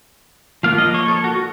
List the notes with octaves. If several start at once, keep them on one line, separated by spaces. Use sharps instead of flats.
F3 A#3 F4 F5
D#5
C#5
A4
F#4